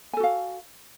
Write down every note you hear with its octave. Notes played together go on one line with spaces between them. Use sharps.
F#4 A4 F5 G#5